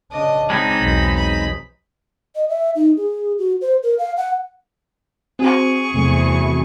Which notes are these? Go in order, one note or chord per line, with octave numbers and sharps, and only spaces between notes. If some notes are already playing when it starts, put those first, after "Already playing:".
C#3 D4 D#5
G#3 C4 D#4 B5
B1 E2
B5
D#5
E5
D#4
G#4
F#4
C5
A#4
F5
F#5
C4 F#4 G#4 C5 C#6
E2 C3 E3 A3